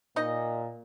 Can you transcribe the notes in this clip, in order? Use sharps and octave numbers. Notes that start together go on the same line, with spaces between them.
A#2 D#4 D#5